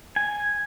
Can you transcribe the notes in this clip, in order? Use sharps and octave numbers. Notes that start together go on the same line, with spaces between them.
G#5